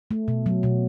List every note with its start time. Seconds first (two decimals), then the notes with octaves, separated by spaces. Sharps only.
0.11 A3
0.28 B2
0.46 F#3
0.63 B2